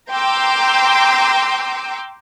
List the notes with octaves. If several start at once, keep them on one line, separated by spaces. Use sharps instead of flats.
G5 A#5 C6 D6 E6 G6